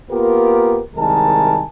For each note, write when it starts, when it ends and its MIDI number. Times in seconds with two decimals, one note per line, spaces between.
0.11 0.80 58
0.11 0.80 59
0.11 0.80 65
0.11 0.80 67
0.11 0.80 70
0.96 1.64 36
0.96 1.64 51
0.96 1.64 56
0.96 1.64 70
0.96 1.64 80
0.96 1.64 81